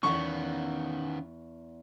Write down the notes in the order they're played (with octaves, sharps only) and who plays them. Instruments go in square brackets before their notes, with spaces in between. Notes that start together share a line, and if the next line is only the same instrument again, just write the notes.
[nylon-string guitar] E2 F#5 A5 [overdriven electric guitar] D#3 B3 [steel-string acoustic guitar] C#4 F5 [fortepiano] C#6